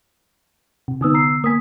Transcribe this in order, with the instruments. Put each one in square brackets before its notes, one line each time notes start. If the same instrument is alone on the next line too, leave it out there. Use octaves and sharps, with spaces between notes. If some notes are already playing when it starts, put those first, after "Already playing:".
[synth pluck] C3
[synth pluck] D3 B3 [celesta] D#4 D#6 E6
[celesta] A#5 E6 C7
[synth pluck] A#3 G#5 [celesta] D#6 B6